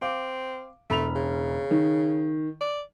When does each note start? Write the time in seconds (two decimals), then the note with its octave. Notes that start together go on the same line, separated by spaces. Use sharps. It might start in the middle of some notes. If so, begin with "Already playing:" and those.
0.02 C4 F5 D6
0.90 E1 A3 B5 F7
1.15 C#3
1.71 D#3
2.61 D5